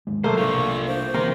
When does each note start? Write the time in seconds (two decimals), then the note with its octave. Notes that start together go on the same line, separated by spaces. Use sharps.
0.07 D#2 G#2 G#3
0.24 B2 F#3 A3 A#3 C5
0.38 C2 C3 G3 D4 F4 C#6
0.87 C5
1.14 D1 C3 E3 A#3 A#4 C6